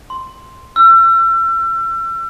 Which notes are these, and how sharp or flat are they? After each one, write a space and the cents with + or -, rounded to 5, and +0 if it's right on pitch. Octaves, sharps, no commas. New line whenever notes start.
C6 +0
E6 +35